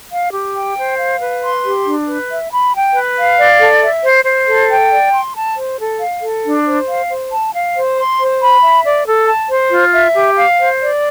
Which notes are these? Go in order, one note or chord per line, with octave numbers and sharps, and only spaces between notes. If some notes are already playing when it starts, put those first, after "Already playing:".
F5
G4
G5
C5
F5
B4
C6
G4
D4
B4
E5
B5
G5
B4
F5
D5
A4
E5
C5
C5
A4
G5
D5
C6
A5
C5
A4
F5
A4
D4
C5
F5
C5
A5
F5
C5
C6
C5
B5
E5
D5
A4
A5
C5
F4
E5
G4
F5
C5
D5